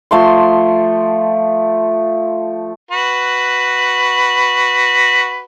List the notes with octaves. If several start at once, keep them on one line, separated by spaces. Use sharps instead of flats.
F3 A3 C6
F#4 B4